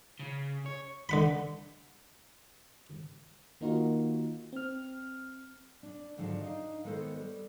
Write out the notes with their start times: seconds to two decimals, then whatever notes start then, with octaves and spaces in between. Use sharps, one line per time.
0.20 C#3
0.66 C#5
1.09 D3 F#5 B5
3.61 D#3 A#3 D#4 F4 F#4 A#4
4.53 C4 F6
5.83 D4
6.17 G#2 D3 D#3 F3 F#3 D4
6.41 D4 D#4 D#5 F5
6.84 D#3 G#3 B3 A4 C5 C#5
7.16 G3